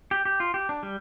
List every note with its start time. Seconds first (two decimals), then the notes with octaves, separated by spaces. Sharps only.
0.11 G4
0.25 G4
0.40 F4
0.54 G4
0.69 D4
0.83 G3